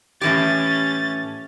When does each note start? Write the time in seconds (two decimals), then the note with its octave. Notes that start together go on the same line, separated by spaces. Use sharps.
0.21 A2 E3 C#4 G4 A6